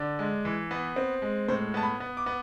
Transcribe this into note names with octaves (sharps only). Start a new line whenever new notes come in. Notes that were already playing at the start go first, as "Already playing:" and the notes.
Already playing: D3 D5
G#3
E3
B3
C4
G#3
A2 C5
B3 A5
B5
B3
D6
B3